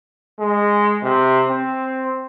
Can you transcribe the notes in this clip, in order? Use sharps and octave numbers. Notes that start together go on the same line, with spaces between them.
G#3
C3
C4